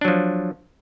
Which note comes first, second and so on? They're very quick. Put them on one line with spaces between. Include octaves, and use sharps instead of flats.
D4 F#3 F3